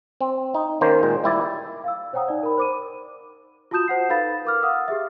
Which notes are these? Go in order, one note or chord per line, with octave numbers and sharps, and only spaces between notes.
C4
D#4
D#3 A#3 C#4 C5
A#2 D#3 G#3
G3 E4 D5
F5 E6
C5 C#5 F#5 G5 A#5 D#6
D#4 D5
A#4 B5
C5 D6 D#7
F4 F#4 A5 D#6 G6 E7
C5 F#5 C7
D#4 A4 B4 F5 B5 A6
A#4 D6 F6
F5 F#5 D#6 E6
G4 G#4 E5